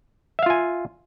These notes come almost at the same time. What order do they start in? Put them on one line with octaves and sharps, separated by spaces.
E5 F5 F4 G#5